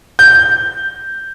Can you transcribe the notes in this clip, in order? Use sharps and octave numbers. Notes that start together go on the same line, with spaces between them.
G6